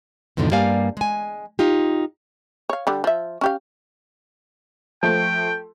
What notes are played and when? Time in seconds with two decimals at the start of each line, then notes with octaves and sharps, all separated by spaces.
0.37 E2 G#2 B2 D3 D#3 F3
0.51 G2 G3 A#3 D5 F5 G#5
0.97 G#3 G#5
1.59 D#4 F4 G4
2.69 C#5 F5
2.87 D3 G3
3.04 F3 E5
3.41 C#4 G4 F5
5.03 F3 A3 G5